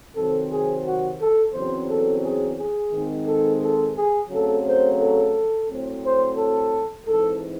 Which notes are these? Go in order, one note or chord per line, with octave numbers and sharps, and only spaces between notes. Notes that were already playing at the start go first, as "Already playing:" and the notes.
C3 D#3 F#3 C4 A4
G#4
F#4
A4
E2 C#3 F#3 C4 C5
A4
G#4
G#4
G#2 D#3 G#3 C4
A4
A4
G#4
C#3 F#3 A3 C4 A4
C5
A4
A2 F#3 C4
C5
A4
G#2 E3 C4 A4